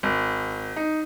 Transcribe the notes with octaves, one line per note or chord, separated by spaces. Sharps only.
G#1
D#4